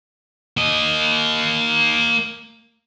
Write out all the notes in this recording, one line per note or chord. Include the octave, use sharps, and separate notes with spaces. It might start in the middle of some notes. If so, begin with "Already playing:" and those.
A#3 D#5